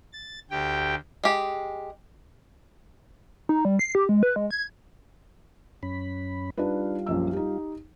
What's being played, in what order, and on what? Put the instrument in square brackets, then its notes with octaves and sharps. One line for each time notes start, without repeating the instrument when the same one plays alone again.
[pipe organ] A6
D2 G4 G5
[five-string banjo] G#3 G4
[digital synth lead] D#4
G3
C7
G4
G#3
B4
G#3
G#6
[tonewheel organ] F#2 C#4 B5
[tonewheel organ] G3 F4 [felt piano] D4 D#4 B4
[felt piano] A#1 F#2 E6
D#4 G4